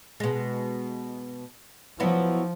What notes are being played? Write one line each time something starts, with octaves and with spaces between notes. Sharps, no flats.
B2 G#3
F3 F#3 B3 E4